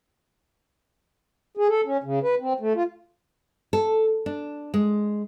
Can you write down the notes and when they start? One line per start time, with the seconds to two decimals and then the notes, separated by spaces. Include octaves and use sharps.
1.57 G#4
1.69 A4
1.85 C#4
2.03 C#3
2.23 B4
2.40 C4
2.60 A3
2.75 F4
3.73 A4
4.26 D4
4.74 G#3